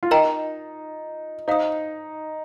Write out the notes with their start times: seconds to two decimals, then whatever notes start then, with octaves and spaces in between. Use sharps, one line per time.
0.03 F4
0.11 D#4 A#4 D#5 G5 A#5
1.48 D#4 C5 F5 A#5 D#6